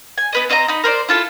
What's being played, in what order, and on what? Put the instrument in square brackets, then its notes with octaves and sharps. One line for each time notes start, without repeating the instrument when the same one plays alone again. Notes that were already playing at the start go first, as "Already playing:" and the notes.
[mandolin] G#5
B3 B4 D#5
C4 D#5 E5 A#5
D#4 B5
A#4 C5 D5
E4 F4 A4